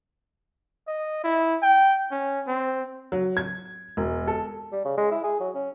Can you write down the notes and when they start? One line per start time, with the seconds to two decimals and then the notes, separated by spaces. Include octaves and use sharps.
0.87 D#5
1.24 E4
1.62 G5
2.11 C#4
2.47 C4
3.12 F#3
3.37 G#6
3.97 E1
4.28 A4
4.72 G3
4.85 C#3
4.97 G#3
5.11 E4
5.24 G#4
5.40 F#3
5.55 C#4